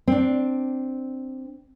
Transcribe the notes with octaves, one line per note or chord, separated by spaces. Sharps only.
C4 D4